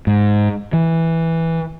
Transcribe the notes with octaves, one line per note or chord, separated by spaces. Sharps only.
G#2
E3